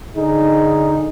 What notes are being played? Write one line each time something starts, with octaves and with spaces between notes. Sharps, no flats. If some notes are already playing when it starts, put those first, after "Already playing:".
D3 D#4 G#4